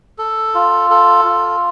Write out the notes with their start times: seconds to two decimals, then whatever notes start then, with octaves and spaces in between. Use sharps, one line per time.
0.18 A4
0.55 F4
0.90 A4
1.25 F4